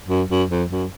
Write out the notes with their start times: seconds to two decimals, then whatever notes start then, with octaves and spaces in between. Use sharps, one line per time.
0.08 F#2
0.29 F#2
0.50 F2
0.70 F#2